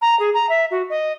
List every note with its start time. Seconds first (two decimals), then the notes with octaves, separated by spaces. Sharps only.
0.01 A#5
0.19 G#4
0.34 A#5
0.49 E5
0.71 F#4
0.90 D#5